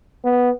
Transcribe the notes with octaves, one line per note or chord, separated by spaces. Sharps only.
B3